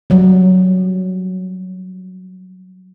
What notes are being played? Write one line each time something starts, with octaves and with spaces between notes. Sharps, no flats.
F#3 G3